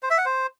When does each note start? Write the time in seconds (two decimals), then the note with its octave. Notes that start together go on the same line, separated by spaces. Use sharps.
0.03 C5
0.10 E5
0.18 F#5
0.25 C5